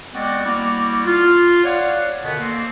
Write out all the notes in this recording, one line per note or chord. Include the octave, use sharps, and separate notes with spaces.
G#3 B3 C4 F#4 D5
G3 A#3 E4 F#4 D5
F4
C#5 D5 F5 F#5
B2 D3 D#3 B3
A#3 C4